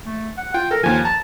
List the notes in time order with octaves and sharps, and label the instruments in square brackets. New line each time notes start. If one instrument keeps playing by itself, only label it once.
[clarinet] A3
F#5
[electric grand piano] F4 [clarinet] G5
[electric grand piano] A4 [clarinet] A#4
[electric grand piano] D#2 F3 [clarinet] G#5
[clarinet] A5 [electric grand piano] A#5